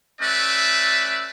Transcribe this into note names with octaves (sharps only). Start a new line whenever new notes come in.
A3 C#4 B4 D5 E5